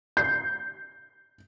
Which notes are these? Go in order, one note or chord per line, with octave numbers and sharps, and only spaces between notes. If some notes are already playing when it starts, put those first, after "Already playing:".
G6 C7